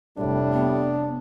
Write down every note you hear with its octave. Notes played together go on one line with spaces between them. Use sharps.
F1 A2 G3 D4
B3